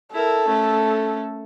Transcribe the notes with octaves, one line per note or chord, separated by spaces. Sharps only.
E4 A4 A#4
A3 C#4